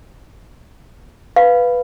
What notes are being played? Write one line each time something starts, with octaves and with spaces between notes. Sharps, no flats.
B4 F5